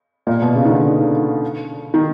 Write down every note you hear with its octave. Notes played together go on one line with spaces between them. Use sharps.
A#2
B2
C#3
D#3
D3
D#3